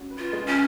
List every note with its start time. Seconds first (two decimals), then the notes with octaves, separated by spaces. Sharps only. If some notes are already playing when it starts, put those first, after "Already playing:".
Already playing: G#3 C#4 F#4
0.10 B4
0.18 F4
0.33 G#3
0.47 C#4